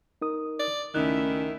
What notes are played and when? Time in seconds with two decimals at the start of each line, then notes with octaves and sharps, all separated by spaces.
0.22 D#4 A#4 D#6
0.59 D5
0.95 C#2 D#3 A3 C#4 D#4 E4 E5 F#6